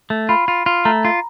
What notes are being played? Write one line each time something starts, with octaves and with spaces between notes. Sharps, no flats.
A3
F4 B5
F4
F4
A3 A#5
F4